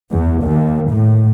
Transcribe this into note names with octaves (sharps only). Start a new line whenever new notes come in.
E2
D#2
A2